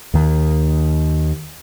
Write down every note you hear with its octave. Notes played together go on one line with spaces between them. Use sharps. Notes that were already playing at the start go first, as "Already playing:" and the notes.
D#2 D#3